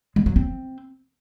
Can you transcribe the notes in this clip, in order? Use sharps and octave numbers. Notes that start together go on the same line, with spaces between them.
G#3
F#3
C4